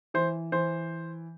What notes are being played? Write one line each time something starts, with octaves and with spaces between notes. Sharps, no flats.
E3 C5
E3 C5